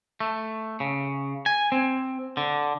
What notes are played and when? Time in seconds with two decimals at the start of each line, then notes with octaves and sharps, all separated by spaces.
0.20 A3
0.80 C#3
1.46 G#5
1.72 C4
2.37 D3